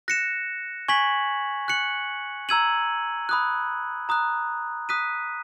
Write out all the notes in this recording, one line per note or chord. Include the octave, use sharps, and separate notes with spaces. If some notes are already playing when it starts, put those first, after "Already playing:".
F#6 A#6 C#7 E7
G#5 C#6 G#6 B6 F#7
F#6 C#7 F#7
A#5 E6 G#6 D#7 F#7
B5 D#6 F#6
A#5 D#6 F#6
D#6 F#6 B6 D#7